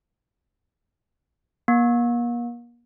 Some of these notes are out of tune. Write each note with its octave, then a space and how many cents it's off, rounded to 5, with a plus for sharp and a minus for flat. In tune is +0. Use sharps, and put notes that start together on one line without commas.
A#3 +40